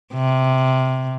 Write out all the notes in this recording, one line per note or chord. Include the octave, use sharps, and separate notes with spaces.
C3